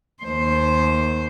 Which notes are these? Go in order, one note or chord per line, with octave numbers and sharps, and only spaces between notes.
D#2 C5